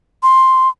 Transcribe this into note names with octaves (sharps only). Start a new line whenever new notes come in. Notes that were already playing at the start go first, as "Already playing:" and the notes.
C6